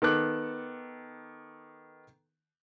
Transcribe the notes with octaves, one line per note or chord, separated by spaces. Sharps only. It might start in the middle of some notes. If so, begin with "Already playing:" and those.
D#3 B3 A4 D6 F#6